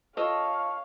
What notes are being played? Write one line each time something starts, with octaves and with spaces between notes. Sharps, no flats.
F4 A4 C#5 D#5 F5